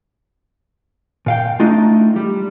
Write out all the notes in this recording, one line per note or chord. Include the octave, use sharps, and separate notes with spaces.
A#2 F5 G5
A3 D4 D#4 F4
G3